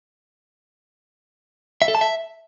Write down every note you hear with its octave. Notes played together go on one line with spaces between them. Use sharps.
E5
A4
A5
E5